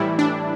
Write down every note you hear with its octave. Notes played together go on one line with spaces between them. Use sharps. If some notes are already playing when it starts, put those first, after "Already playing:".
Already playing: A2 E3 G3 E4
D4